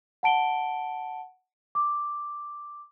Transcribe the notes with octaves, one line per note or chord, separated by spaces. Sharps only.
F#5 A5 D7 G7
D6